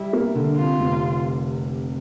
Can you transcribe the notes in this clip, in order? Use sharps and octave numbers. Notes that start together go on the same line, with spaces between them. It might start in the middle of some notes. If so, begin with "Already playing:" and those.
Already playing: G3 E4
A#3
D3
C3 F4
F1